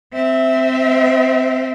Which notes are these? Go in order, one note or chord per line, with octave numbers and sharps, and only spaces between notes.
C4 E5